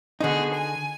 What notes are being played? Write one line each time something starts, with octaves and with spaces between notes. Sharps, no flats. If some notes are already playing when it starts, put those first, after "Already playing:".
D3 B3 D#4 F#4 G#4
G#5